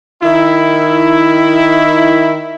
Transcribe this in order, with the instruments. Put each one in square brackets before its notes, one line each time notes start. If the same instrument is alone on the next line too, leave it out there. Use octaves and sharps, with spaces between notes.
[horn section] D#3 E4